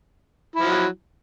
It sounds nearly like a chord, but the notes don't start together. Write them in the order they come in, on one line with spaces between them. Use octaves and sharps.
E4 F3 F#3